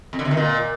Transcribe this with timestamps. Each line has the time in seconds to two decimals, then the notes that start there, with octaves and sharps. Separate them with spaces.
0.13 F2
0.19 D3
0.25 C3
0.31 D#3
0.37 A#2